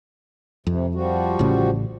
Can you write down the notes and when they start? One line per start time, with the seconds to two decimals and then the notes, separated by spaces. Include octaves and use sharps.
0.67 F2 C3
0.95 F3 G3 F#4
1.39 A1 A2 C#3